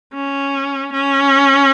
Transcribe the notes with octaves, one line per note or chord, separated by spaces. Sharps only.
C#4
C#4